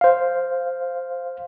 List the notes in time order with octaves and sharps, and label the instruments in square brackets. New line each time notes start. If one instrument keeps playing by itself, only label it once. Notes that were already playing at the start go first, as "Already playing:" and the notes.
[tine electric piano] C5 F5